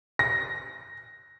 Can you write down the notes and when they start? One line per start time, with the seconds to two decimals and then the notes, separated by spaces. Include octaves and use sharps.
0.19 A#6